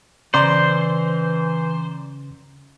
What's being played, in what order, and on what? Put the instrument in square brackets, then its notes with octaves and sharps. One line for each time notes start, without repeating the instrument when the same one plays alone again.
[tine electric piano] C#3 C#4 [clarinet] E3 [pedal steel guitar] C5 [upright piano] D5 A#5 C6